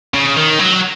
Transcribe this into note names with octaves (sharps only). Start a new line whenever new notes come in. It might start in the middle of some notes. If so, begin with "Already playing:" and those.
C#3
D#3
F#3